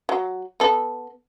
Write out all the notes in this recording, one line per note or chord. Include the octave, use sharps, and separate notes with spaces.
F#3
B3 A4